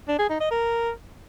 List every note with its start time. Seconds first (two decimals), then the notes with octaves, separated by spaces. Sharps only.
0.08 D4
0.19 G#4
0.30 D#4
0.40 D#5
0.51 A#4